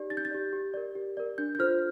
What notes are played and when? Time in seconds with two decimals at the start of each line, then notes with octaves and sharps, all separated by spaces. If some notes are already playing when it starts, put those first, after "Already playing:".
Already playing: D#4 G4 D5
0.10 D#4 A6
0.17 G6
0.25 A6
0.31 G4 D5
0.53 G4
0.74 A#4 D5
0.95 G4
1.17 A#4 D5
1.38 D4 G6
1.55 G6
1.59 F4 A4 C5 F6